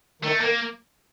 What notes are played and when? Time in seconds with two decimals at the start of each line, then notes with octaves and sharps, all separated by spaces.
0.22 D#3 A3
0.40 D#3 A#3